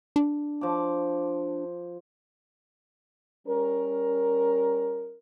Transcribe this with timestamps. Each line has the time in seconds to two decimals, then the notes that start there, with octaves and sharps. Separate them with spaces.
0.16 D4
0.61 F3 D6
3.48 G3 C#4 A#4